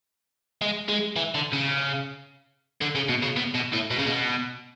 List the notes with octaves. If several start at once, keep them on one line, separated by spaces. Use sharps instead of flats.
G#3
G#3
E3
D3
C#3
D3
C#3
B2
C#3
B2
B2
A2
B2
C#3
B2